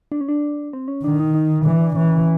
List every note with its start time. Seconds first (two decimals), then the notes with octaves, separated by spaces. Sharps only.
0.12 D4
0.21 C#4
0.28 D4
0.73 C4
0.88 C#4
1.03 D#3 D4
1.20 D#4
1.34 D#4
1.64 E3 D4
1.81 D4
1.96 E3 C#4